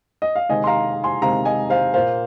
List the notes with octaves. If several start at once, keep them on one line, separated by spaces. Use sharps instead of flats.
D#5
F5
C3 D#3 G#3 C4 D#5 G#5
C6
F5 A#5
G#5 C6
C3 D#3 G#3 C4 F5 A#5
D#5 G#5
C5 F5
A#2 A#3 C5 F5